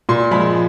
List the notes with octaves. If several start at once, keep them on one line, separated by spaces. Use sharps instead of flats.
A#2 C6
F3 G#3 B5